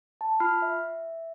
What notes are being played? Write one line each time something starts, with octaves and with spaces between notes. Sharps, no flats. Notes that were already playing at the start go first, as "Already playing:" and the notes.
A5
F4 B5 F6 C7
E5